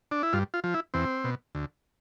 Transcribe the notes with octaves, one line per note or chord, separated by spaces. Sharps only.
D4
E4
G2 F4
F4
F3
E4
E2 C4
B2
D2